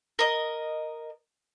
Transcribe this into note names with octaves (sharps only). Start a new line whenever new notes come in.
A#4 D#5